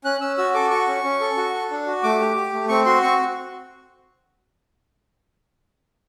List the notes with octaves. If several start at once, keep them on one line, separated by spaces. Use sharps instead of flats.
C#4 F#6
C#4 E6
F#4 E6
A4 D6
F#4 C#6
C#4
C#4
A4
F#4
A4
D4
F#4
A3 D6
G4
G4
A3
C4 C#6
F#4 C6
C4 C#6